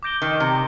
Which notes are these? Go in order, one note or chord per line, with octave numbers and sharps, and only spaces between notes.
D6 G6 A#6 D7 G7
D#3
C3